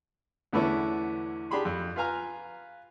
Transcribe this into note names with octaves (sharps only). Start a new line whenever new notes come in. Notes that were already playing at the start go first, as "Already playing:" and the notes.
E2 D3 A3 B3 C#4 E4
D4 G4 G#4 B5 C6
F2
F4 B4 F5 G#5 A#5 F6